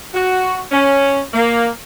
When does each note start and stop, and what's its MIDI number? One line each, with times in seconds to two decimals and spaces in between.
0.14 0.59 66
0.71 1.21 61
1.34 1.69 58